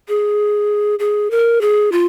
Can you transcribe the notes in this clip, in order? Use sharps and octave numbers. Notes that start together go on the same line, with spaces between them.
G#4
G#4
A#4
G#4
F4